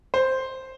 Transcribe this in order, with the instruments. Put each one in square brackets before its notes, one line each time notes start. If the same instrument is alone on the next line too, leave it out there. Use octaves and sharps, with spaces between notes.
[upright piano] C5